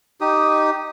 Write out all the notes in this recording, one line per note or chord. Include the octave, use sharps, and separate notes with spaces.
D#4 G4 D#6